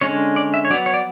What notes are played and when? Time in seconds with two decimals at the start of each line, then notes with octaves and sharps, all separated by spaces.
0.01 D3 G#3 C#4 C#5
0.36 D5
0.54 E5
0.65 C#5
0.70 F#3 D5
0.74 B3
0.86 C#5
0.94 D5